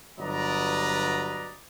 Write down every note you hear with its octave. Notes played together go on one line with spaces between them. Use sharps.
G1 F#3 B4 D5 D#5 A#5